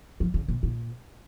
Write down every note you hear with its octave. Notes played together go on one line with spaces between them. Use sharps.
F3
C#3
A#2
A#2